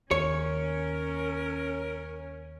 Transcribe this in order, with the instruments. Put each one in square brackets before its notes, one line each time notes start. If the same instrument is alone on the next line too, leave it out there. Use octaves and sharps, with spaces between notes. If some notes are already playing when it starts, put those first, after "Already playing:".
[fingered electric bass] D#2 [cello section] C#4 [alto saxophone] A#4 [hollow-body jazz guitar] C#5